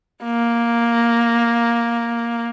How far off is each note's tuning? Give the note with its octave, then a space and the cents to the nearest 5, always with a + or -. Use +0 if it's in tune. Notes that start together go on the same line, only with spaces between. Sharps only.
A#3 +5